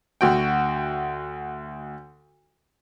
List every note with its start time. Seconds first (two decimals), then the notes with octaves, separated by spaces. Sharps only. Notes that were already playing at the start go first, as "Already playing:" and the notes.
0.21 D2 F#4 G5